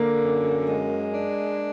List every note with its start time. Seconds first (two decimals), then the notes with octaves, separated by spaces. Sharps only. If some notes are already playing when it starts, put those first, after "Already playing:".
Already playing: D3 A#3
0.22 F#2
0.68 G#3
1.13 D4